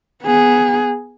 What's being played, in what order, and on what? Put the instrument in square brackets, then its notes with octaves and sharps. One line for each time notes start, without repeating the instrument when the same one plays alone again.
[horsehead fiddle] B3 G#4